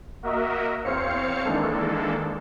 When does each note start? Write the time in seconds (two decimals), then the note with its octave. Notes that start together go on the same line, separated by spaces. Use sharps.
0.23 A#3 F#4 A#4 D#5 E5
0.84 E2 C4 C5 C#5 F5 C#7
1.44 D#3 E3 G#3 A#3 D4 A4